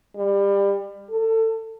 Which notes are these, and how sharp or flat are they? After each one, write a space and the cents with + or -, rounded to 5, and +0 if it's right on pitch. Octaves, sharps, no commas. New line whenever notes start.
G3 +25
A4 +25